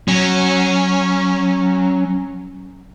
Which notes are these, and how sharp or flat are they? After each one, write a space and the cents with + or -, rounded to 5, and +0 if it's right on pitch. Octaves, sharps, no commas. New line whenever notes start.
F#3 +5 C#4 -10